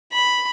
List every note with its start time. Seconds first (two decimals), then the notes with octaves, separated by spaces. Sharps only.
0.13 B5